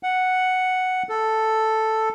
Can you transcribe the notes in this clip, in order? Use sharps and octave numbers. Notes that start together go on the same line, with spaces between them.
F#5
A4